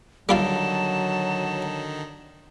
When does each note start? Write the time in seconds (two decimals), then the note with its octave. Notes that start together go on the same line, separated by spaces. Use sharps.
0.29 D3 D#3 F#3 G3 D#4 F4 F5 A5